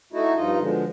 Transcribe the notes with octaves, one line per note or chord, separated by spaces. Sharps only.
A3 D#4 E4 F#4
G2 F3 D#4 F4 D#5
B2 D3 F3 G#3